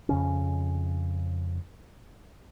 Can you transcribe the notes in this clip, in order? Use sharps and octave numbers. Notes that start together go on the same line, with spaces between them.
F2 C#3 C#4